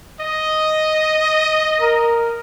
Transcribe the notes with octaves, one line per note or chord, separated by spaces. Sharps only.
D#5
A#4